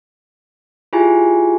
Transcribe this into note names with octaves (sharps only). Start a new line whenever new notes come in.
E4 F4 G4 G#4 G#5